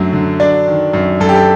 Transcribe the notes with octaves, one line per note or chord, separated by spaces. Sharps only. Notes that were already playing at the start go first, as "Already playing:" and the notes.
Already playing: F#2 D3 F#3 A3
D3
F#3 D4 D5
D#3
F#2
F#2 A4
G4
A4